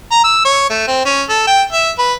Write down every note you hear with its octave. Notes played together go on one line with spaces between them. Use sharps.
A#5
E6
C#5
A3
C4
C#4
A4
G5
E5
B4